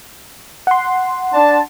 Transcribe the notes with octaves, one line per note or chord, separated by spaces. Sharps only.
F#5 C6
D4 A5